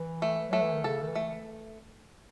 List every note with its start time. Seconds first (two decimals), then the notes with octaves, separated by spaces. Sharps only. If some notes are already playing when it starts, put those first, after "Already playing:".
Already playing: E3
0.22 A3
0.49 F#3 A3
0.62 E3
0.72 D#3
0.84 C#3 A4
1.02 D#3
1.08 E3
1.15 A3